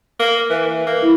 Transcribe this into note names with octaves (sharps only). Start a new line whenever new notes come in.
A#3
E3
A#3
E4